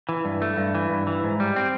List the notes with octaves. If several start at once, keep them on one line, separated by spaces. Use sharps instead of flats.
E3
G2
A3
G2
E3
G2
E3
G#2
G3
C4